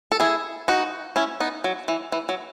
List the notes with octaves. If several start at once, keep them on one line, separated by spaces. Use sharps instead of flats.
A4
E4 G#4
D#4 F#4
C#4 E4
B3 D#4
F#3
E3
E3
F#3